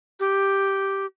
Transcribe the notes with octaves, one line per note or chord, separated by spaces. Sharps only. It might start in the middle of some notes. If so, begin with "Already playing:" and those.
G4